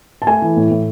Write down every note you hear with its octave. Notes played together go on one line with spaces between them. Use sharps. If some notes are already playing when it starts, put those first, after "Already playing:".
A5
A3 G#5
E3
A2
A2